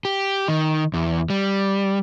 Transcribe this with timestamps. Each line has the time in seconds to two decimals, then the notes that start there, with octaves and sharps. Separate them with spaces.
0.05 G4
0.48 D#3
0.94 E2
1.30 G3